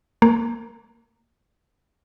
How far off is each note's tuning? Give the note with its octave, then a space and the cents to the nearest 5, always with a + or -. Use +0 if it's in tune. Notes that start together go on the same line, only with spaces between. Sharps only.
A#3 -15